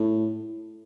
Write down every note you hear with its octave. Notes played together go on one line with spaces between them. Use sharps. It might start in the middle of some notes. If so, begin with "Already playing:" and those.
Already playing: A2